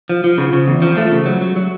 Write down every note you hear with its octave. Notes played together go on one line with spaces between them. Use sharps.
F3
F3
C#3
C#3
E2
F3
A3
C#3
F#3
F#3
F#3